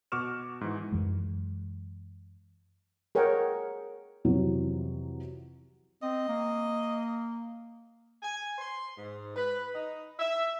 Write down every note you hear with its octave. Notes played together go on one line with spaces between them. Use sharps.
B2 F#4 C#6 D6 F6 E7
G#2 E3
F#2 E3 G#3
G#4 A#4 C#5 F#5 G5
F2 C3 E3 F#3
C4 D#5
A#3
G#5
C6
G#2
B4
D#4
E5